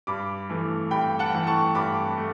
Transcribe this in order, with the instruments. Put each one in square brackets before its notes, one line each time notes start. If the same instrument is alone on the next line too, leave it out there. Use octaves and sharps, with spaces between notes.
[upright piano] G2 B5 D6
E3 A3
G2 G5 B5
F#5 A5
E3 A3
A5 C#6
G2 B5 D6
A3